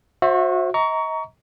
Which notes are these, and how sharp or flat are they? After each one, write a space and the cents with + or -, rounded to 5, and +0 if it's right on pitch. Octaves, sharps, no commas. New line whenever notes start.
F#4 -30 C5 +25 E5 +0
D#5 +35 A#5 +0 C#6 +25